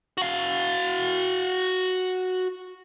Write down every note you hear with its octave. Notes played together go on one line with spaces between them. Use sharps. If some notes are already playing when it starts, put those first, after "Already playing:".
F#4 F5